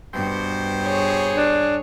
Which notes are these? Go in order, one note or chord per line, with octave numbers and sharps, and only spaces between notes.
G2 B2 G4 C5
G#4 C#5
D4